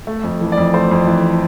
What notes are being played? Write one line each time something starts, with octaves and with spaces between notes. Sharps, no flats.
A3
F2
E3
D5
F2
A3 C5
F2
E3